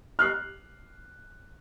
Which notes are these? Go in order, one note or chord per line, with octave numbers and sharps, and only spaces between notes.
F6 F#6 C7